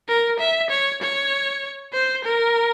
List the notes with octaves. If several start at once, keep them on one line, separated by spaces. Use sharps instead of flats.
A#4
E5
C#5
C#5
C5
A#4